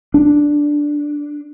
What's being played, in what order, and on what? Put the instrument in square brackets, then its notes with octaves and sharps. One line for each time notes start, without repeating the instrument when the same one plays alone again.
[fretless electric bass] D4